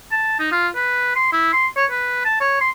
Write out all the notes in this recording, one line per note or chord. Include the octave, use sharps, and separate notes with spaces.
A5
D#4
F4
B4
C6
E4
C6
C#5
B4
A5
C#5
C6